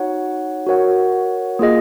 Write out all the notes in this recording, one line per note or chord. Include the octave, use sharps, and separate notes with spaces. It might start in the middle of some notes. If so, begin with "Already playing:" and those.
Already playing: D#4 F#4 C#5 F#5
F#4 A#4 C#5 F#5
A#3 F4 G#4 D#5